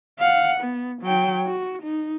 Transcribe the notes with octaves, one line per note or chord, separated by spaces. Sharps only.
F5 F#5
B3
F#3 G5
F#4
D#4